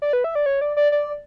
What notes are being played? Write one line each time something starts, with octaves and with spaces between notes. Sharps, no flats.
D5
B4
E5
D5
C#5
D5
D5
D5